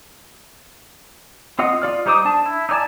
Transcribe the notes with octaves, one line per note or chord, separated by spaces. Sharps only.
C4 F4 D#5 F#5 D#6
F4 D5 F6
G3 D#4 C5 D6 D#6
D4 A5
E4
D#4 E4 D5 G#5 A5